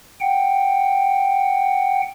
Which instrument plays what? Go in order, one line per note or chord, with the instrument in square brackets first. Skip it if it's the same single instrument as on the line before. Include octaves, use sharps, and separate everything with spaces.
[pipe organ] F#5 G5